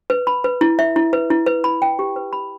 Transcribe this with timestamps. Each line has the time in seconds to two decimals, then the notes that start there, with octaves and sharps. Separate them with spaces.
0.10 B4
0.27 B5
0.44 B4
0.61 E4
0.79 E5
0.96 E4
1.13 B4
1.30 E4
1.46 B4
1.64 B5
1.82 G5
1.99 G4
2.16 B4
2.33 B5